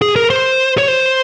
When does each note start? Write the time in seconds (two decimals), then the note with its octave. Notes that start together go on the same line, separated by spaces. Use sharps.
0.02 G#4
0.16 A#4
0.30 C5
0.78 C#5
0.88 C5